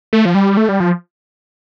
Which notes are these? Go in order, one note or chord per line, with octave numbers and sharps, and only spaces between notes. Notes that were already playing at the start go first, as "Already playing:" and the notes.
A3
F3
G3
A3
G3
F3